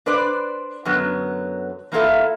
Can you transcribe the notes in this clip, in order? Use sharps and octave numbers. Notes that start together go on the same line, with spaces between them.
D4 B4 C5 D5
F#2 D3 F#3 B3
E3 A#3 E4 F4 A4 E5